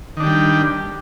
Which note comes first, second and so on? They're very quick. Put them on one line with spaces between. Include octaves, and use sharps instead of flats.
D#3 D4 G4 G3